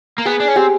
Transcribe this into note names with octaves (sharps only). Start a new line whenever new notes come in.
A#3
B3 G#4
D4
C#4
C4 G4